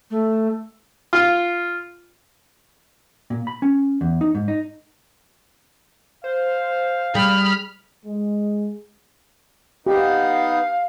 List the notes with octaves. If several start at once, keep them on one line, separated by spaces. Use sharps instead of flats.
A3
F4
A#2
B5
C#4
E2
D#4
G#2
D#4
C5 F5
G3 G#4 B5 F6
G#3
B3 D#4 G4 F5